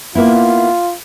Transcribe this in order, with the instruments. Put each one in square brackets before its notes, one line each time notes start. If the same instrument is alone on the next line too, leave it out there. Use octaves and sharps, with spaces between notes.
[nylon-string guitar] A#3 B3 E4 [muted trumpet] F4